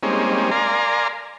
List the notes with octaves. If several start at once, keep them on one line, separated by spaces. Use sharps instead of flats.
G3 G#3 A#3 C4 C#4 D#4
A#4 D5 F5 G#5 A#5 C6